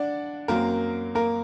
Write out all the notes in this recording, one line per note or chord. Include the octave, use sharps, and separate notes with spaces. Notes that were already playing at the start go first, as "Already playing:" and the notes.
Already playing: D4 D5 F#5
F#2 F#3 A#3 C4 A#4
A#3 A#4